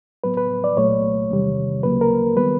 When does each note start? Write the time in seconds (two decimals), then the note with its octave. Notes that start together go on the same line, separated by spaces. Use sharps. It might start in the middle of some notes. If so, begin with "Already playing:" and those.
0.24 A2 F#3 B3 B4
0.37 B4
0.64 D5
0.77 C2 A#2 F#3 A3 C#5
1.31 E2 C3 D#3 G3
1.83 D2 C#3 F#3 A#3 B4
2.01 A#4
2.37 D#3 G3 B3 B4